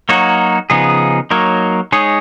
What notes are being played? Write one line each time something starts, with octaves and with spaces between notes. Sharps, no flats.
F#3 A#3 D#4 F#4 C#5
C#3 F3 B3 D#4 G#4
F#3 A#3 D#4 A#4 C#5
G#3 D#4 G#4 C#5